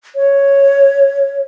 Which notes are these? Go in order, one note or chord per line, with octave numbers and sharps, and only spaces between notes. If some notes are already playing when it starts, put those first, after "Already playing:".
C#5